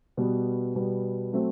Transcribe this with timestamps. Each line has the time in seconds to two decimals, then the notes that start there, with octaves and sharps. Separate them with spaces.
0.17 B2 G3 B3
0.75 B2 G3 B3
1.33 F#3 A3 C4